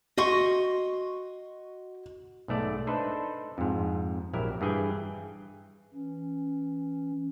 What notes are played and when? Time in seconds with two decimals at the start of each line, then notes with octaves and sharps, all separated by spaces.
0.17 F#4 D#5 C6 C#6
2.48 B1 G#2 A3 D5
2.87 D4 D#4 A4 B4 C5
3.58 F2 G#2
4.33 A#1 F#3 E4 G4 A#4
4.61 G2 E3 G#4 G5 G#5
5.94 E3 C#4